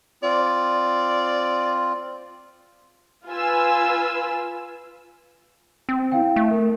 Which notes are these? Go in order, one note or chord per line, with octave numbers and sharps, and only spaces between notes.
C4 F4 D5
F4 B4 G#5 E6
C4
E4 F5 G5
A3
A#4